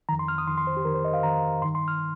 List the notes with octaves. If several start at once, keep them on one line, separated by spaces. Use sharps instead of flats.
F2 D#3 A#5
C6
F6
D#6
F2 D#3 C6
C6
C5
G4
F2 D#3 A#4
C5
D#5
F5
F2 D#3 A#5
G2 D#3 C6
C6
F6